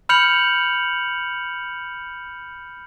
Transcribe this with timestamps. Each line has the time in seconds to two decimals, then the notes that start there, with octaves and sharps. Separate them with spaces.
0.09 B5 F6 G6 C#7 F7 F#7